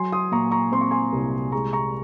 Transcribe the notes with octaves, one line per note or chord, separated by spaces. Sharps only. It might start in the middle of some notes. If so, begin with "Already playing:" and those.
Already playing: F#3 G#5 C6
C6 D#6
A#2 A#5 C#6
A#5 C#6
C4 C6
C#6
G#5 C6
C2
G#3 A#5 C#6
A#5 C#6